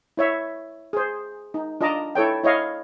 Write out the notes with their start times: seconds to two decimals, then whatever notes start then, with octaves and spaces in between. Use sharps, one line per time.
0.17 E4 C#5 E5
0.93 G#4 C5
1.54 D#4
1.81 D4 F4 D#5 A5 A#5 D6
2.15 E4 A4 C#5 G5
2.44 E4 C#5 D#5 F5